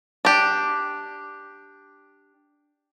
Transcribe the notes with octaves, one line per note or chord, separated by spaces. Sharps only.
D4 G4